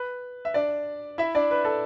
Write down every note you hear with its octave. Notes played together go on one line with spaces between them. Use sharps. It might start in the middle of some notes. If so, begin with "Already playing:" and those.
Already playing: B4
E5
D4 D5
E4 E5
D4 D5
B4
A4